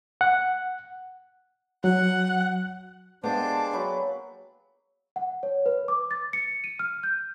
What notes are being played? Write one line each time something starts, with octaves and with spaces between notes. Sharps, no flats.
F#5
F#3 F#5
G#3 A#3 B3 D4 G4 C5 A5 D6
F#3 B5
F#5
C#5
B4
D6
A6
C#7
D#7
F6
G6